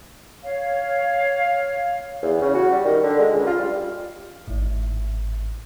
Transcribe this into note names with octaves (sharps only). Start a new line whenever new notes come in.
C#5 F5
E2
C#3
F#4
G3
D#3
D3
G#3
C#2
F4
G3
G#1 A2